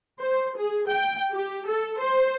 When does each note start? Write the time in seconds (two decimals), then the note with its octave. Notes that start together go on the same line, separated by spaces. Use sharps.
0.20 C5
0.58 G#4
0.90 G5
1.32 G4
1.69 A4
2.01 C5